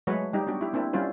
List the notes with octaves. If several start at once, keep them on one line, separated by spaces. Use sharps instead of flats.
F#3 G#3 A3 F#4 B4 C#5
G3 D#4 G4
B3 D4 F#4 G4
E4 G4
A#3 C4 D4 E4
G3 C#4 E4 F4 C5